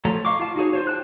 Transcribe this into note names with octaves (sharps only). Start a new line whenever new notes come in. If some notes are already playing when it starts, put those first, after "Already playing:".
F3 A3 A4 C#5 A#5
D#5 F5 C#6 D6
F4 F5 A5
D#4 F#4 G#4 C#5
F4 C5 C#5
G5 A5 F#6